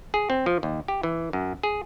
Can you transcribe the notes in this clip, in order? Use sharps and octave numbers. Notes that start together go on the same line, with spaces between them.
G#4
C4
F3
D#2
G4
E3
F#2
G#4